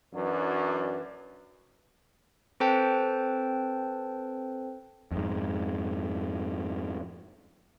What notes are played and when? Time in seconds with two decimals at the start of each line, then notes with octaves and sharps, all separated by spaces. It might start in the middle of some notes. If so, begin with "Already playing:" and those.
0.14 F#2 E3 F#3 D4
2.60 C4 A4 B4 C5 G5 A5
5.11 F2 G#2